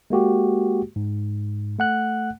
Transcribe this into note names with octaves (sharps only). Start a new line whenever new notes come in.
G#3 A#3 F#4 G4
G#2
A3 F#5 F#6